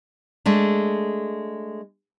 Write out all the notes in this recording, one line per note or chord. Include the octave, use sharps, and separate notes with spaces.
G#3 A3 D4